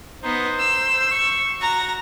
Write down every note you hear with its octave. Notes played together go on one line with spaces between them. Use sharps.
B3 D#4 C5
E6
C#6
F#4 A#5